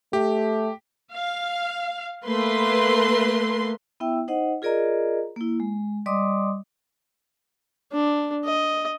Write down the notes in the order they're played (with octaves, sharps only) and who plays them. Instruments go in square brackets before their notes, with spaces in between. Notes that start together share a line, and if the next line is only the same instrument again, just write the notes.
[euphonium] A3 [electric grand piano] G4
[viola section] F5
A3 A#3 B4 C6
[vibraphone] B3 E4 E5 G5 E6
D#4 C5 D#5 F#5
F4 G#4 A#4 D5 D#5 A#5
A#3 E4
G#3
G3 D5 D#5 C6 D6 D#6
[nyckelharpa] D4
D#5